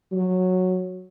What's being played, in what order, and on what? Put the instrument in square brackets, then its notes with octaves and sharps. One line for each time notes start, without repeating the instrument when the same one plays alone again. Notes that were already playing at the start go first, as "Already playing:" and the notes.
[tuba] F#3